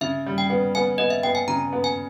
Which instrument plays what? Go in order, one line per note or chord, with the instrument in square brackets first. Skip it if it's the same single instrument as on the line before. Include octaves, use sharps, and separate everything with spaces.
[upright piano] C#3 [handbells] E5
[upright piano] G3
[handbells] G5
[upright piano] B3
[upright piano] B3 [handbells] G#5
[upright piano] B3 [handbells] D#5
[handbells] E5
[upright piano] B3 [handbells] G5
[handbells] G#5
[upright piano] C#3 [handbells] A#5
[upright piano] B3
[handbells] G#5